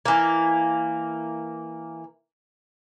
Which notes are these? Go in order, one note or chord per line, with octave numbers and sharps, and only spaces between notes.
E3 A#3